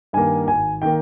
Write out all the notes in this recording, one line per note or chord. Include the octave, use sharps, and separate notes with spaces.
G2 D#3 A#3 G#5
G#1 G#5
D#3 A#3 G5